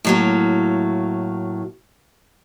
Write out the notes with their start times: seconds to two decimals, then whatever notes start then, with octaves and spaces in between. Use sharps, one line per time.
0.05 A2 F#3 A#3